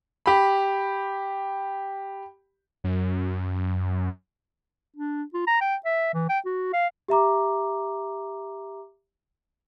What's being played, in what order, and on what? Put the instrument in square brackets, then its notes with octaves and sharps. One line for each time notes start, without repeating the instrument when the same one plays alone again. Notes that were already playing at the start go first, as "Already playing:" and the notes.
[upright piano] G4 B5
[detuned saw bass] F#2
[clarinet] D4
F4
A#5
G5
E5
E3
G5
F#4
F5
[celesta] G4 E5 A#5 D6